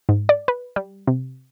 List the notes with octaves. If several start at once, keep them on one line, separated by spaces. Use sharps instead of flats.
G#2
D5
B4
G3
C3